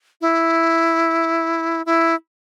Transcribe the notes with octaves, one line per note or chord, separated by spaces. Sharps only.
E4
E4